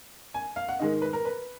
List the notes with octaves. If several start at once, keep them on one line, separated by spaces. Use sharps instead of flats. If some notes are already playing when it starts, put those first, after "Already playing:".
G#5
F5
F#5
G#2 D#3 G#3 D#5
B4
A#4
B4